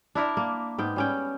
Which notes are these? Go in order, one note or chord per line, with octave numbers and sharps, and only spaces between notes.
D4 E4 A#4 D5
A#3
G#2 B3 G5
G3 C#4 G5